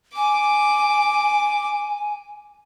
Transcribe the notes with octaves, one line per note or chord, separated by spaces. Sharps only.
G#5 D6